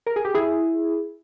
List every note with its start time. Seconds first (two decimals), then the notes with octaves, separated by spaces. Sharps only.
0.06 A#4
0.16 G#4
0.25 G4
0.34 E4 G#4